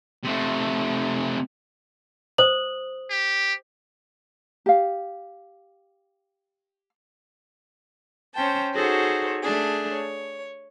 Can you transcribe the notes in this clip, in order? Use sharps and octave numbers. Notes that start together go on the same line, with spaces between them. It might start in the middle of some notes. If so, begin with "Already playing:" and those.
C3 A3
C5 D#6 F#7
G4
G4 F5
C#4 C5 G5 A5
D#4 F#4 G#4 A4 C5 C#5
A3 D4 G#4
C#5